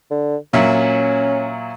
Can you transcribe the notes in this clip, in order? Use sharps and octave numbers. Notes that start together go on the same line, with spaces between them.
D3
A#2 F#3 C#4 E5